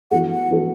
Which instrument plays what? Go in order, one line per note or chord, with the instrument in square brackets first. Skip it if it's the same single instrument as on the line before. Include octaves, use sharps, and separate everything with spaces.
[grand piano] E3 B3 F#4 A4 [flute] F#5
[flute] F#5
[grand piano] E3 B3 F#4 A4